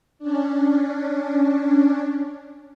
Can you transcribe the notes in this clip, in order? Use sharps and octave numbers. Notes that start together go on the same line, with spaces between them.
C#4 D4